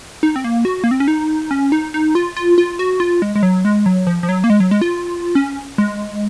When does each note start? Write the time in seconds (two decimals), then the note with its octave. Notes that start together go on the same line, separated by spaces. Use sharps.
0.23 D#4
0.36 C4
0.44 A#3
0.65 F#4
0.84 A#3
0.91 C4
1.00 C#4
1.08 D#4
1.51 C#4
1.72 D#4
1.94 D#4
2.15 F4
2.37 F4
2.58 F4
2.79 F#4
3.00 F4
3.22 G#3
3.36 G#3
3.43 F#3
3.65 G#3
3.86 F#3
4.07 F3
4.23 F3
4.29 F#3
4.44 A#3
4.50 G#3
4.60 F#3
4.71 G#3
4.82 F4
5.35 C#4
5.78 G#3